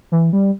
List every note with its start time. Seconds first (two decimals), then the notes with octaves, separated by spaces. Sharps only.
0.12 E3
0.33 G3